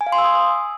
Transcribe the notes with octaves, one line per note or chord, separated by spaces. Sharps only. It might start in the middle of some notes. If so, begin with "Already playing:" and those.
G#5
F5
C6
E6
D#6